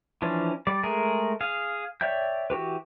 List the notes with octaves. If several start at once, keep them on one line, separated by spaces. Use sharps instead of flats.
E3 F3 C#4 D4
G3 D5
G#3 A3 G#4 A#4
G#4 F5
C#5 D5 E5 G5 G6
E3 F#4 G4 B4